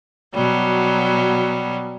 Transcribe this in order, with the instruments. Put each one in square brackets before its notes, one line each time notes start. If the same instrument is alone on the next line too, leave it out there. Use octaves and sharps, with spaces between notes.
[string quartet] B2 F#3 G3